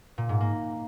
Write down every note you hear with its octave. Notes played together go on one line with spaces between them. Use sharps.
A#2
G#2
A#3